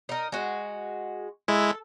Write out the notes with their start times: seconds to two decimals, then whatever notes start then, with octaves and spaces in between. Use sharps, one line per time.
0.09 D#4 A#4
0.32 G#3 F#4
1.48 G#3 E4 A4